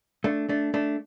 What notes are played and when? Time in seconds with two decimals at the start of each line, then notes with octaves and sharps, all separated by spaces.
0.24 A3 D4
0.49 A3 D4
0.74 A3 D4